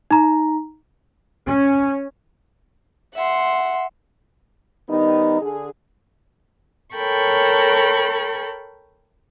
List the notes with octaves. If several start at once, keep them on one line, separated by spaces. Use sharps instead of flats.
D#4 A#5
C#4
E5 F#5 C6
D#3 G3 B3 D#4
D3 G#4
A4 A#4 C#5 G5 B5 C#6